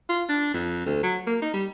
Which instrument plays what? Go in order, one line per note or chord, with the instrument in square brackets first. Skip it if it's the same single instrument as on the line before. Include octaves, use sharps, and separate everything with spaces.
[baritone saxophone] F4
D4
F2
D2
F#3
A#3
D#4
G3